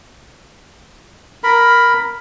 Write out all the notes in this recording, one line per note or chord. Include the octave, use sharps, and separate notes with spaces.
A#4 B5